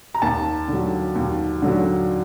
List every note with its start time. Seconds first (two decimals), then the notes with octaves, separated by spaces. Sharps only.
0.14 A#5
0.22 D#2 A5
0.68 D3
0.73 F#3
1.15 D#2
1.62 D3 F#3